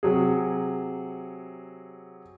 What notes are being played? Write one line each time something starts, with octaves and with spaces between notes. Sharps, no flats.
C3 F#3 G#4